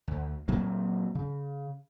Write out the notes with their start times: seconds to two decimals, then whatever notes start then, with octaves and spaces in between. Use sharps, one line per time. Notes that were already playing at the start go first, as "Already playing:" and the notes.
0.08 D2
0.48 A#2 F#3 A#3 C4
1.15 C#3